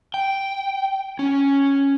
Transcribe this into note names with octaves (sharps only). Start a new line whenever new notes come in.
G5
C#4